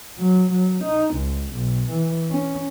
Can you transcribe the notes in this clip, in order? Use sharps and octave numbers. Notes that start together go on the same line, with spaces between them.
F#3
F#3
D#4
C#2
B1
E3
C#4